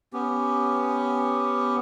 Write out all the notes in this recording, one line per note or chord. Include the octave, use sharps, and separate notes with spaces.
B3 C#4 G4